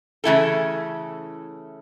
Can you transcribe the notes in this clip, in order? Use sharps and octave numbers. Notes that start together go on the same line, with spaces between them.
C#3 E3 A3 E4 A4